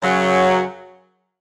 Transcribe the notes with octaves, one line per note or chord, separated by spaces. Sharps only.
F#2 C#3 F#3